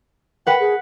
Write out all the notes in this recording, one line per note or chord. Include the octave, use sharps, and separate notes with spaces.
B4 F#5 G5
G#4